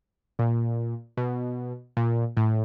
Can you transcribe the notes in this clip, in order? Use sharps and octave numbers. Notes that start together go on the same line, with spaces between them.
A#2
B2
A#2
A2